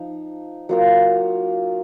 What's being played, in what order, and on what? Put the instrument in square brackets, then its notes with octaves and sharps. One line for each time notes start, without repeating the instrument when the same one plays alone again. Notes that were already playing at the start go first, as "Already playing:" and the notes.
Already playing: [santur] F3 D#4
F#3 A#3 F4 A#4